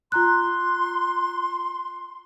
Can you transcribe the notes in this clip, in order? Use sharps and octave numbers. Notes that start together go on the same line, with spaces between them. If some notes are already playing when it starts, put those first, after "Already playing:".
F4 A#5 C6 F#6